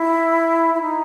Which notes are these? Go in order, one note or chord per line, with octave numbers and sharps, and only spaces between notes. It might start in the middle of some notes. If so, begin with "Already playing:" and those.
Already playing: E4
E4
D#4